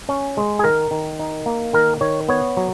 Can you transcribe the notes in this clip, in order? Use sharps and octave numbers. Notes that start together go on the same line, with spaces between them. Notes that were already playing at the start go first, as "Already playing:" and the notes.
C#4
G#3
G#4
D#3 A#4
D#3
D#4
A#3
D#3 A#4
D#3 C#5
B3 C#5
F#3